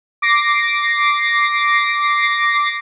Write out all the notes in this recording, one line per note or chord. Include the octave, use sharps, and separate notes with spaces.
D6 A#6 C7